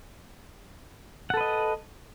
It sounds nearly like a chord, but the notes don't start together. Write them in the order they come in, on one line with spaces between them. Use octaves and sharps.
F#5 A4 B4 D#5